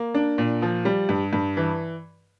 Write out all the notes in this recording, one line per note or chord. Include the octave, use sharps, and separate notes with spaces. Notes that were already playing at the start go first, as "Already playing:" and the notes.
Already playing: A#3
D4
A#2
F3
G3
G2
G2
E3